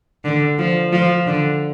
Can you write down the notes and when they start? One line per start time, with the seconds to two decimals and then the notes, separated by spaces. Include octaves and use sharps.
0.25 D3
0.59 F3
0.93 F3
1.27 D3